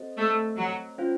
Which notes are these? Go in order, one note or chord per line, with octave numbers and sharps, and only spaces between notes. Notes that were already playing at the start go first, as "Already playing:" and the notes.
Already playing: C4 F#4 A4 C5 D#5
A3
F#3
C#4 F4 C5 F5